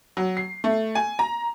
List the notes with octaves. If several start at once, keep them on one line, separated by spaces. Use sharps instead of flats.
F#3
C7
A3
G#5
A#5